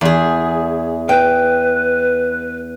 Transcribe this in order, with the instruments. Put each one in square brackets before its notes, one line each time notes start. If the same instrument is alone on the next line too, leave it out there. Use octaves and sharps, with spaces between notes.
[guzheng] E2 G#4
[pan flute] B4 [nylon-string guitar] G5